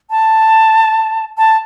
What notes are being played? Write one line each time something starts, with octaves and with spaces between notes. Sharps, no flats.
A5
A5